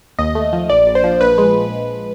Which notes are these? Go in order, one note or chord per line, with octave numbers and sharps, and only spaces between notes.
D#2 D#5
A3
F3
A#1 D5
A#1
C5
F3
A#1 B4
G#3